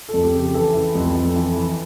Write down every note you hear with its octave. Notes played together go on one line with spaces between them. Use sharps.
F2 A4
G4
C#3
G4
E3 A4
E3
F2
F2
E3
E3